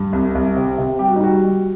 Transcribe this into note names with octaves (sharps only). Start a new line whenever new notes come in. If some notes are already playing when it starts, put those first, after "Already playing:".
Already playing: G2
C2
C2
C3
C3
G3 G4
F#4
D#4
G3 F#4
G3